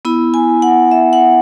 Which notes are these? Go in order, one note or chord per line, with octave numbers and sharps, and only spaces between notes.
B3 E4 B5
G#5
F#5
E5
F#5